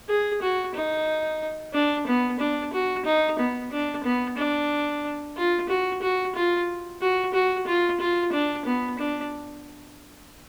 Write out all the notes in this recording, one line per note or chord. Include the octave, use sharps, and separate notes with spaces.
G#4
F#4
D#4
D4
B3
D4
F#4
D#4
B3
D4
B3
D4
F4
F#4
F#4
F4
F#4
F#4
F4
F4
D4
B3
D4